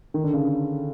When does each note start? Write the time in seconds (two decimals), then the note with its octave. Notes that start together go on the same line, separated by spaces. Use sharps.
0.14 D#3
0.24 D3
0.33 C#3